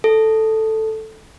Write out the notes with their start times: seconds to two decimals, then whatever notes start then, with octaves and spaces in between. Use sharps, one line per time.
0.04 A4